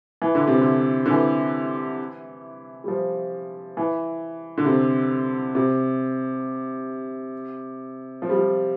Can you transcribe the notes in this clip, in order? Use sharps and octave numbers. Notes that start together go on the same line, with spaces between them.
E3
D3
C3
D3
D3
E3
G3
F3
E3
D3
C3
C3
F3
G3
F3